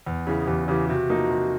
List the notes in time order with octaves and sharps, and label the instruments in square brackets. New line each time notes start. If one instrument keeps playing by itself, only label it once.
[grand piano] E2
[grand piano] C#3 E3 [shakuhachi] G#4
[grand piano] E2 [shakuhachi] G4
[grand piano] C#3 E3 [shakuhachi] G4
[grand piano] C3 [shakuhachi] F#4
[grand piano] F3 A#3 D#4
C3